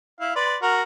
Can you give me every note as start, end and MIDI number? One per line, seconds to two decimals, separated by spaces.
0.20 0.31 64
0.20 0.31 77
0.36 0.56 71
0.36 0.56 74
0.36 0.56 84
0.62 0.83 66
0.62 0.83 70
0.62 0.83 82